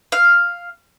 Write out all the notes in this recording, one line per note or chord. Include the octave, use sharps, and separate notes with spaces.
F5